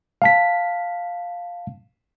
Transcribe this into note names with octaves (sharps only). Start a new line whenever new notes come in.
F5 A5 B6